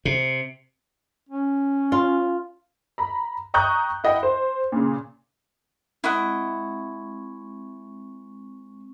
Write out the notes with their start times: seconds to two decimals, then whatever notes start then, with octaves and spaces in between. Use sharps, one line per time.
0.05 C3
1.29 C#4
1.92 F4
2.98 A#5 B5
3.54 G5 A#5 C#6 D#6 F#6 G6
4.04 E4 D#5 F#5 G5
4.23 C5
4.72 A#2 C#3
6.04 G#3 C4 E4 D#5 F#5 C#6